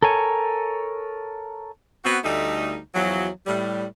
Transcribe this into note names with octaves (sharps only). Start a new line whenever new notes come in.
A4 A#4 C#5 G#5
B3 C4 F#4
D2 G3 A3 D#4
E2 F3 F#3
A2 G3